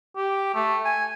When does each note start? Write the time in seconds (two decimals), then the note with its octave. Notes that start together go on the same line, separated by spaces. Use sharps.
0.16 G4
0.54 A3
0.85 G#5